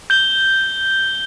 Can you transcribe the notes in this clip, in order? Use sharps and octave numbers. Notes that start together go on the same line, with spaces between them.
G6 G7